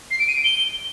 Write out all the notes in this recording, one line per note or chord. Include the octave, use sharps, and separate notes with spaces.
C7
D7
D#7
D7
G7